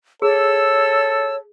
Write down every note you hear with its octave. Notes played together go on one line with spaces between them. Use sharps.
G#4 A4 C#5 E6